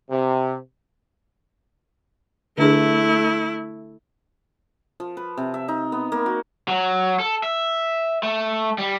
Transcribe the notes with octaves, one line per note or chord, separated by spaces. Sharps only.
C3
D3 A3 D4 E4 G#4
F3
B4
C3
E5
D#4
B3
A#3
F#4
F#3
A4
E5
A3
G3